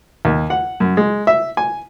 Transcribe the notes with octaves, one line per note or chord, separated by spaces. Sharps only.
D#2
F#5
F#2
G#3
E5
G#5